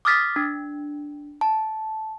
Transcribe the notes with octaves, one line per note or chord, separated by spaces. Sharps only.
D6 D#6 F6 A6 B6
D4
A5